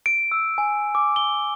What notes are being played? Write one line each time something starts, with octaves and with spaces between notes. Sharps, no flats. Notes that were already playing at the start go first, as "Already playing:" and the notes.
D7
E6
G#5
D6
G7